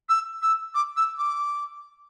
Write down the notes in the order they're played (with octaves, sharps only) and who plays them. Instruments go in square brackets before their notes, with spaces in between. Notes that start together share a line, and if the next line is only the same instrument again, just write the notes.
[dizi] E6
E6
D6
E6
D6